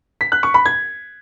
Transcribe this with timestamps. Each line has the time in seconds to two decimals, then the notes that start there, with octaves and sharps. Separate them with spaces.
0.21 B6
0.32 F#6
0.43 C#6
0.54 B5
0.66 G#6